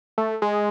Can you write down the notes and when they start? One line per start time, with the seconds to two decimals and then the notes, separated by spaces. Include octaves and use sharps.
0.18 A3
0.42 G#3